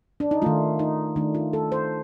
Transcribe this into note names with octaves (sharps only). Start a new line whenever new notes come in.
D4
D#4
D#3 A3 F4
D#4
D#3 A3 D4
F4
A4
C5